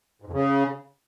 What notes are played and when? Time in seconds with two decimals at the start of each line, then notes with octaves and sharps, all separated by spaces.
0.22 G#2
0.27 F2
0.33 C#3